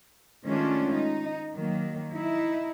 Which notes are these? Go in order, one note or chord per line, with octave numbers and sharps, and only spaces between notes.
D#3 G#3 A3 C#4 D4 F4
D#4
D#3 F#3 A#3
D#4 E4